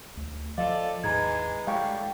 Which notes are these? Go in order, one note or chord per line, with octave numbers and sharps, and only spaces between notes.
D2
F3 F4 A4 D5 D#5 F5
D#2 G#2 E3 G#3 A#5 G#6
A2 D3 G3 G#3 F5 G5 C#6